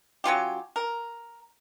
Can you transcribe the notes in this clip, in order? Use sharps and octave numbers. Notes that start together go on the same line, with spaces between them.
F#3 C#4 F4 G4
A#4